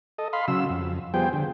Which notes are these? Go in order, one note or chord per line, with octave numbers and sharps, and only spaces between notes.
A4 D#5
F5 B5 C6
C#3 F#3 E6
F2
F3 G3 B3 G#4 C5 G5
D3